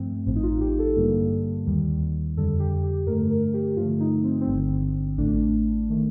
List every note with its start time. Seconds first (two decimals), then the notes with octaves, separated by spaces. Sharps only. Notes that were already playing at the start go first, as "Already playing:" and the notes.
Already playing: G2 F3 A3 C4
0.26 A1 A2 F3 C4
0.36 D#4
0.43 F4
0.61 G4
0.79 A4
0.96 G2 D3 G3 A#3
1.66 D#2 D#3 G3
2.37 F2 D3 G3 A4
2.59 G4
2.84 G4
3.07 G2 D3 A3 A#4
3.30 A#4
3.54 G4
3.76 G2 D3 F3 A3 F4
4.00 D#4
4.24 C4
4.41 C4
4.47 G1 G2 D3
5.17 A1 A2 A3 D4
5.90 D#3 A3